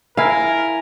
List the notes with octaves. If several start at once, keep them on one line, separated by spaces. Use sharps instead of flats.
E4 A#4 F5 G#5